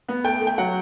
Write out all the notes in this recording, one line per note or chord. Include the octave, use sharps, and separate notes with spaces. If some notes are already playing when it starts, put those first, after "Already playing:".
B3
A3 G5
A3
G5
F#3 F#5